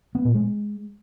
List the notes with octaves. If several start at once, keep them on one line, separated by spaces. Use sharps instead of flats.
B3
A#2
G#3